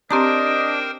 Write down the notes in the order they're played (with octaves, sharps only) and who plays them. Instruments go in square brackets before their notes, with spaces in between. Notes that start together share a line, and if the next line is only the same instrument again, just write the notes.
[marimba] C4 G4 A#5 [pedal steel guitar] D4 [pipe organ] A#4 C5 G5 [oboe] D#5